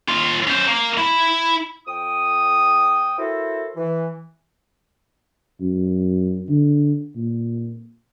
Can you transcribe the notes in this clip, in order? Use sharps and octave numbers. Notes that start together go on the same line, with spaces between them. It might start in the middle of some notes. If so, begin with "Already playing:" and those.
D#2 F4
C#4 C5
A#3
E4 B5
F2 G5 D#6
E4 F#4 A4 A#4 C5
E3
F#2
D3
A#2